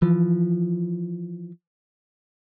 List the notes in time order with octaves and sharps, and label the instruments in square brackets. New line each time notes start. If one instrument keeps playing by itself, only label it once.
[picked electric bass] E3 F3